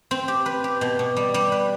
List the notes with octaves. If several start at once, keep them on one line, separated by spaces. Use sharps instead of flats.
C4
G4
B4
G4
B2
B2
G3
G3
B4